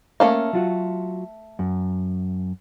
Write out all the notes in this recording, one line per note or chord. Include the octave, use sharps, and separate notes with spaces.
A3 A#3 C#4 A4 A#4 F5
F#3 F4 F#4
F#2